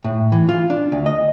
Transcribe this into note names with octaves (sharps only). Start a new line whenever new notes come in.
A2
E3
F4
D4
D2
D#5